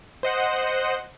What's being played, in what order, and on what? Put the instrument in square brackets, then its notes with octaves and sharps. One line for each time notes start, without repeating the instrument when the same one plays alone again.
[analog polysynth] C5 D#5 F#5